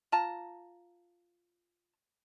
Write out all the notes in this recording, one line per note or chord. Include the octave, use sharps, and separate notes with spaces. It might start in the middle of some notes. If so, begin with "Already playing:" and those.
F4 A5 A#5